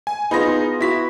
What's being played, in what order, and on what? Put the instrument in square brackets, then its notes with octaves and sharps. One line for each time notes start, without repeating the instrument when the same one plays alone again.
[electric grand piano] G#5
[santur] B3 F4 [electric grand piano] D#4 G#4 A#6
[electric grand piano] E4 B6 [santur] F#4